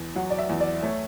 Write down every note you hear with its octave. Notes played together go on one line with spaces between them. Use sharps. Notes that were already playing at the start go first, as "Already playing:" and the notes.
Already playing: E2
F#3 F#5
D5
E5
E2
D5
A3 C#5